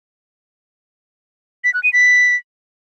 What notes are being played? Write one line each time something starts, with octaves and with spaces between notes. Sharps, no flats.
B6
F#6
D#7
B6